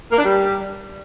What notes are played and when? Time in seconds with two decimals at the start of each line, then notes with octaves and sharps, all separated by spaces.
0.12 A#3
0.18 D4
0.25 G3